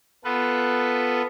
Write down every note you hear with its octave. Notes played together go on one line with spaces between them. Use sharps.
B3 F4 A4 B4